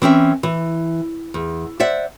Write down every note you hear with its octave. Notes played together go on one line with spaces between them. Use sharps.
E3 C4 C#4 E5
E3
E2
C5 D5 E5 F#5